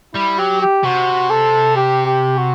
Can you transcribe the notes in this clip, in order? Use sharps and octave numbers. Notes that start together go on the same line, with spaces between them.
G3 E4
F#3 G4
G4
C3 F#4
A4
G4
G4
F#4